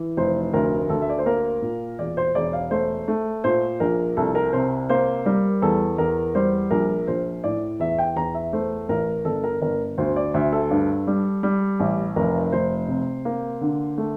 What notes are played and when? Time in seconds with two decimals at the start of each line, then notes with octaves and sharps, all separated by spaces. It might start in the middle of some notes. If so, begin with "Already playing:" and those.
Already playing: E3
0.17 F1 C5
0.53 D2 A#4
0.90 D2 A4
1.02 E5
1.10 D5
1.18 C5
1.26 A#3 A#4
1.62 A#2
1.99 E1 D5
2.17 C5
2.35 E1 D5
2.53 F5
2.71 A3 C5
3.08 A3
3.44 A#2 C5
3.80 A#1 A#4
4.17 C2 A4
4.35 A#4
4.53 C3 C5
4.89 A#3 C5
5.26 G3 A#4
5.62 E2 A4
5.98 E2 A#4
6.35 G3 C5
6.71 A#1 A#4
7.07 A#1 C5
7.44 A2 D5
7.79 E2 E5
7.98 G5
8.16 E2 A#5
8.34 E5
8.53 A3 C5
8.89 A1 A#4
9.25 G1 A4
9.44 A#4
9.62 G1 A#4
9.98 D2 C5
10.16 D5
10.34 D2 E5
10.53 A4
10.70 G2
11.07 G3
11.43 G3
11.80 A1
12.16 F1 A#4
12.52 F1 C5
12.88 C3
13.25 A#3
13.61 D3
13.98 A3